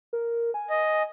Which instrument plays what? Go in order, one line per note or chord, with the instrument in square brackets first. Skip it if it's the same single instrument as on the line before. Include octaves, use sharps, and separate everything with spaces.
[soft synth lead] A#4
G#5
[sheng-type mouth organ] D#5